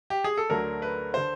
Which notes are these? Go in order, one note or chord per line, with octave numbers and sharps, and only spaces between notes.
G4
G#4
A4
D2 D3 F#3 A3 A#4
B4
D3 C5